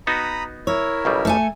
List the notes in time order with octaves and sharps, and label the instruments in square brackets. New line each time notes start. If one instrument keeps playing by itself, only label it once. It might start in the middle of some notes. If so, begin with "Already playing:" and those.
[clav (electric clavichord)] B3 D#4 F#4 [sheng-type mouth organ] A#5 B5 D#6
[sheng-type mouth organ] E4 A#4 E5 [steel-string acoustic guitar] C#5
[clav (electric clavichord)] B1 C#3 G3
[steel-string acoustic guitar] A3 A4 G#5